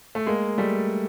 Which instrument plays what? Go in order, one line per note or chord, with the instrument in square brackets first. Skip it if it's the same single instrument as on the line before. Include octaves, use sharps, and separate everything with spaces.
[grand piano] A3
G#3 A#3
G3 A3